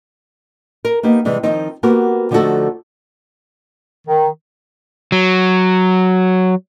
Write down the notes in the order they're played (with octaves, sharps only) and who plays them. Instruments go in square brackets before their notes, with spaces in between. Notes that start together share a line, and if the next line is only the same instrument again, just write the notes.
[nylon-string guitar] A#4
A#3 B3 D#4 G4
C3 E3 G3 G#3
D#3 F3 C4 D#4
A#3 B3 F#4 G4 A#4
D3 F3 A3 D#4 F#4 A4
[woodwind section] D#3
[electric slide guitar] F#3